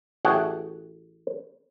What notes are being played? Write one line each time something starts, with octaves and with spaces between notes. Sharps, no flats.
A1 F#4 G#4 F#5 G5 A5